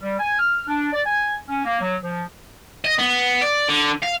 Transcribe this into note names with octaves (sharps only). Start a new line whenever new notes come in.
G3
G#5
F6
D4
D5
G#5
C#4
A#3
F#3
F3
D#5
B3
D5
D3
F5